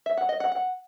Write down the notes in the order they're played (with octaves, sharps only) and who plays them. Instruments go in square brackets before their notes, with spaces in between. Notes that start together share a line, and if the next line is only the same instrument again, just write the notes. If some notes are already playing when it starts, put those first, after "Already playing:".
[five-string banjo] E5
F#5
D#5
F#5
F#5